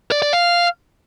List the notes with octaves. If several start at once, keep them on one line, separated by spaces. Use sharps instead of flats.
D5
D5
F5